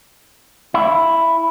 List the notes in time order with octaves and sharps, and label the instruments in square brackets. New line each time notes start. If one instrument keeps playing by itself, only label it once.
[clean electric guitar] E4